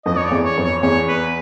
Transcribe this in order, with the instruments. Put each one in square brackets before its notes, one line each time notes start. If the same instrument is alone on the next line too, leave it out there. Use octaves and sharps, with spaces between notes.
[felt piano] F2 [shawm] D#5
[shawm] C#5
D5
[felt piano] E2
[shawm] C#5
[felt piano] F2
[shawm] C#5
[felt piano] E2 [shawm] C#5
[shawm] B4